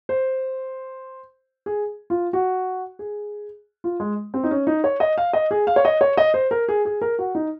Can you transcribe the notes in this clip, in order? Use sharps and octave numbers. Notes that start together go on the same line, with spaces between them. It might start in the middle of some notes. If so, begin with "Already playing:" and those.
C5
G#4
F4
F#4
G#4
F4
G#3
C4
D#4
C#4
D#4
C#5
D#5
F5
D#5
G#4
F5
C#5
D#5
C#5
D#5
C5
A#4
G#4
G#4
A#4
F#4
D#4